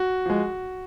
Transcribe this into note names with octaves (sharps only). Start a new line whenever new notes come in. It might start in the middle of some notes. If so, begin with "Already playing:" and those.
Already playing: F#4
F3 G#3